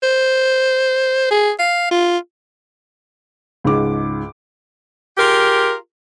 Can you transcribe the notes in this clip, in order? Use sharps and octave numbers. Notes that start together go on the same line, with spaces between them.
C5
G#4
F5
F4
C#2 G#2 D6
F4 G4 G#4 A#4